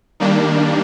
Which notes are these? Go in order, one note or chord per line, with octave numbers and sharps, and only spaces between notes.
D#3 G3 A#3 D4